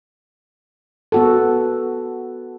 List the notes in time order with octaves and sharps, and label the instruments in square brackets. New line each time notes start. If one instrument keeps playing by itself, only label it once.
[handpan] B3 F#4 A4